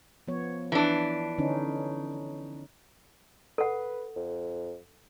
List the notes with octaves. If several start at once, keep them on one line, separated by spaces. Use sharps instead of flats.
F3 B3 C#5
E3 D4
D3 C#4 D#4
A4 B4 F#5
F2